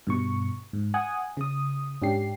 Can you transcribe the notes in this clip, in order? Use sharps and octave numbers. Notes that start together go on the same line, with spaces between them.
G2 B2 C#6
G#2
F#5 G#5 D#6 F#6
C#3 D#6
G#2 C#4 D4 G4 C7